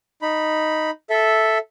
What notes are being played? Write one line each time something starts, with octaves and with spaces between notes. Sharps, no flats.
D#4 B5
A4 E5